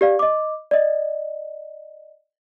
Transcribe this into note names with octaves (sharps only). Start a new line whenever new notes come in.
G4 D5 F5
D#5 D6
D5 D#5